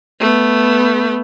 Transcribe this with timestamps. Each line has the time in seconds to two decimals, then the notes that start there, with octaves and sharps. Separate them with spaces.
0.20 A3 B3